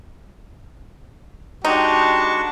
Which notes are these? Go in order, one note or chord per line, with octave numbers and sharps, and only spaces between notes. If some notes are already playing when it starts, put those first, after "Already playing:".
G#3 D4 D#4 F#4 G4 A5 C#6